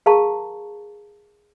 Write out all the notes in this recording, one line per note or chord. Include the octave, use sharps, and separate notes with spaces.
G#4 A#4 F5 A5 A#5 C#6